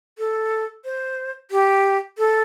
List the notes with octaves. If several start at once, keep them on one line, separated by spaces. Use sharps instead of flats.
A4
C5
G4
A4